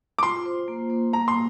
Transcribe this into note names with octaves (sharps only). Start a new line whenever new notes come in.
D6
F4 C6
C5
A#3
A#3
A#3 A#5
C6